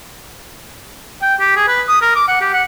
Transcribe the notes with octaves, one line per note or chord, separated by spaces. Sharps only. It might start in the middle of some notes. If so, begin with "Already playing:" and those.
G5
G4
G#4
B4
D#6
A#4
D6
F#5
G4
F#5